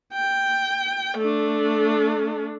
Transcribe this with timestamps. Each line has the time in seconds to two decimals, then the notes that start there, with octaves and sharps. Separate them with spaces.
0.13 G5
1.17 A3 D4